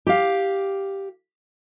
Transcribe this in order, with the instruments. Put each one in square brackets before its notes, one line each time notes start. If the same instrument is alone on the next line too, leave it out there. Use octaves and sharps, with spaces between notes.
[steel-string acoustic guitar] G4 F5